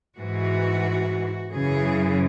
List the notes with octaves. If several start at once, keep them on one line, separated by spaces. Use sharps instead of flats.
G#2 E3 F#4
F#2 C#3 E3 G#4